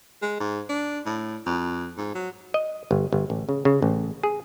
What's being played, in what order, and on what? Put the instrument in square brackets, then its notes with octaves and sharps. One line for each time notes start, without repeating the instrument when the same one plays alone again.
[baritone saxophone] G#3
G#2
D4
A2
F2
G#2
F#3
[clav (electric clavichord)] D#5
G1
G1
A1
C#3
C#3
A1
G#4